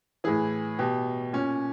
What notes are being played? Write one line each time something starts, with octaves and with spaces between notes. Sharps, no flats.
A2 E3 G#4
B2 G4
A#2 C#4